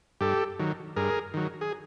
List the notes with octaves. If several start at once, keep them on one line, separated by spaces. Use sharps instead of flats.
G2 G4 A4
D#3 F#3
G2 G#4 A#4
D#3 F#3
G#4